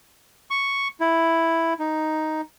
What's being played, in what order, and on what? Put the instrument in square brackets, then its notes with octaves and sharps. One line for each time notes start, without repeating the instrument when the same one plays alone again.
[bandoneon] C#6
E4
D#4